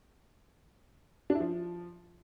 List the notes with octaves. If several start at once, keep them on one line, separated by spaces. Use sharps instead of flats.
D4
E4
F3